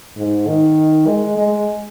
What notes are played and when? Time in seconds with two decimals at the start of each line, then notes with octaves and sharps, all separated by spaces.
0.16 G#2
0.47 D#3
1.07 G#3
1.38 G#3